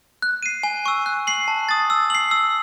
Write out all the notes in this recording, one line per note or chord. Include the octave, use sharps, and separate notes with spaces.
F#6
C7 D#7
G#5
C#6 E6
F#6
C7 F#7
A5
D#6 A6
E6
C7 F#7
E6